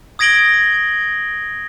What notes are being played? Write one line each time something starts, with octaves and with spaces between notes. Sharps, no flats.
D#6 G#6 A#6 D7 F#7 G7